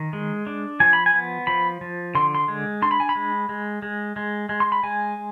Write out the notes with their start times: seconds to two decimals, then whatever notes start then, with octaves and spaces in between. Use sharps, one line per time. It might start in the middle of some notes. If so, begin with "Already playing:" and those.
Already playing: D#3
0.13 G#3
0.47 D4
0.80 F3 G#5
0.93 B5
1.06 G#5
1.13 B3
1.47 F3 B5
1.81 F3
2.15 D3 C6
2.35 C6
2.48 G#3
2.82 D4 C6
2.91 B5
3.00 G#5
3.09 B5
3.15 G#3
3.49 G#3
3.82 G#3
4.16 G#3
4.49 G#3
4.60 C6
4.72 B5
4.83 G#3 G#5